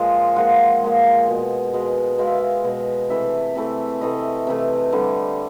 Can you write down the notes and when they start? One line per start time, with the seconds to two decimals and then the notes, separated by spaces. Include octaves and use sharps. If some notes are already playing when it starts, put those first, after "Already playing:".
Already playing: A#2 F3 G#3
0.36 A#2 F3 G#3 F#5
0.82 A#2 F3 G#3
1.28 B2 G#3
1.73 B2 G#3
2.18 B2 G#3 F5
2.27 E5
2.35 F5
2.64 B2 G#3
3.10 C3 E3 A3 E5
3.55 C3 E3 A3
4.01 C3 E3 A3 D#5
4.47 C3 E3 A3
4.92 D3 G3